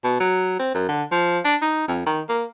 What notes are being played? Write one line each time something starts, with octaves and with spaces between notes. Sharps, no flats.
B2
F#3
C4
F#2
D3
F3
D4
D#4
F2
D#3
A#3